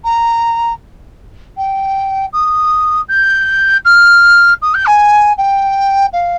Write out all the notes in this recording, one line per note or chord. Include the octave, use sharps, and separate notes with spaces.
A#5
G5
D#6
G6
F6
D#6
G6
G#5
G5
F5